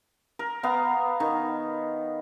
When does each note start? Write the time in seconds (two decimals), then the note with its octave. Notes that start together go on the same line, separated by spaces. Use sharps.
0.39 A#4
0.63 B3 F5 A#5
1.20 D#3